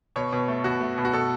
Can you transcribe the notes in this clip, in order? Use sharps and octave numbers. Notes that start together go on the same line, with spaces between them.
B2 C#5
B2
A3
B2 F#4
A3
B2
F#4
B2 A4